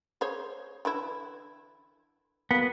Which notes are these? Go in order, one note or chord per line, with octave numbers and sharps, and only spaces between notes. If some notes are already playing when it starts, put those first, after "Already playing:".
G#4 C5 C#5
D3 E3 E4
A#3 B3 F#4 A4